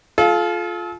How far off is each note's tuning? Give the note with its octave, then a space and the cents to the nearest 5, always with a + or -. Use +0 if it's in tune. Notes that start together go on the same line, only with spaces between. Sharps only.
F4 +0 A4 -40